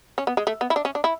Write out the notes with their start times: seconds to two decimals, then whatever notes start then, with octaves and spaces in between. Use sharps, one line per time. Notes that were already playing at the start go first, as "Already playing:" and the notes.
0.18 C#4
0.27 B3
0.37 G#3
0.47 A3
0.61 B3
0.70 E4
0.76 D4
0.85 C#4
0.95 D4
1.04 E4